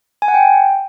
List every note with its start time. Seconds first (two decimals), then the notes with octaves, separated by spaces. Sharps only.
0.22 G#5
0.28 F#5
0.34 G5